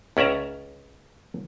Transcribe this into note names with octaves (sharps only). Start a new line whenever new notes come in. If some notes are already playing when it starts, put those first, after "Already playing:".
C#2 C#4 D5 E5 A#5